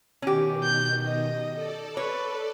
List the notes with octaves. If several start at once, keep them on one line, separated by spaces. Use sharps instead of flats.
B2 D#3 C#4 G4
G6
D#5
A4 D5
B4 C#5